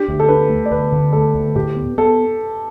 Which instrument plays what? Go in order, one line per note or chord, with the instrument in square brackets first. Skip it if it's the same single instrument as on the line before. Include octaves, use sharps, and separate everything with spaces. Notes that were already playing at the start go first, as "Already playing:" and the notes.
Already playing: [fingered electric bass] D4 [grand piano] G4
[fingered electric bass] D2
[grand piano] A4
[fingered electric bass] D4 [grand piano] B4
[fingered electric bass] A3
[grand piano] D5
[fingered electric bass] D2 [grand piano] B4
[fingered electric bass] D3
[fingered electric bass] A3 [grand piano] A4
[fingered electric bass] D2
[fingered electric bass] A2 [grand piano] G4
[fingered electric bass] B3
[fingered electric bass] B3 [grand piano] A4